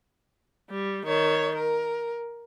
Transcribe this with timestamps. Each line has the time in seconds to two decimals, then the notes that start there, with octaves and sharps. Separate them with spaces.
0.71 G3
1.06 D#3 C#5
1.56 A#4